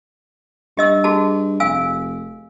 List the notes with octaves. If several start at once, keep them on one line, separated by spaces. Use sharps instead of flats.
G2 G4 D#5 E6
F#4 G#4 A5
F1 F5 G#5 E6